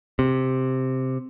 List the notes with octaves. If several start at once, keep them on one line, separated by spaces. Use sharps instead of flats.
C3